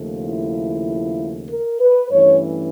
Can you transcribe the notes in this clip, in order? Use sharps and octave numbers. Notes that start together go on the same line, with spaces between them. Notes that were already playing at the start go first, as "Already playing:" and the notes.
Already playing: D#2 C#3 F3 A3
E4
A#4
B4
G2 E3 A3 C#4 C#5